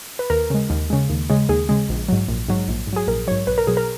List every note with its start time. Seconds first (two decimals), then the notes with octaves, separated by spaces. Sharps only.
0.19 B4
0.30 D#2 A#4
0.50 C#3 G#3
0.70 D#2
0.90 C#3 G#3
1.09 D#2
1.30 C#3 G#3
1.49 D#2 G#4
1.69 C#3 G#3
1.89 A#1
2.08 G#2 F#3
2.28 A#1
2.48 G#2 F#3
2.68 A#1
2.87 G#2
2.93 F#3 G#4
3.07 A#1 A#4
3.27 G#2 F#3 C#5
3.47 B1 B4
3.58 A#4
3.67 B2 F#3 G#4
3.77 A#4